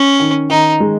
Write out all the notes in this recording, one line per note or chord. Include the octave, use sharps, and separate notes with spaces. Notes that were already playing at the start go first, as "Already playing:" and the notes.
Already playing: C#4
D#3
D#3 D#4
G#3